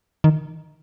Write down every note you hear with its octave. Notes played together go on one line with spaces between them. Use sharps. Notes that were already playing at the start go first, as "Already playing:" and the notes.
D#3